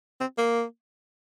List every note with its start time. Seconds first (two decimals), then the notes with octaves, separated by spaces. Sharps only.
0.20 C4
0.38 A#3